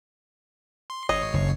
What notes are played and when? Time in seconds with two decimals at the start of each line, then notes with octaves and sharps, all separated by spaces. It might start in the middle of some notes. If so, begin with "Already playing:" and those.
0.90 C6
1.09 G#1 C#5 D#5 C7
1.34 F#1